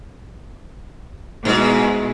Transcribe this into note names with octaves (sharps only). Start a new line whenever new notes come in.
G#2 B2 G#3 B3 E4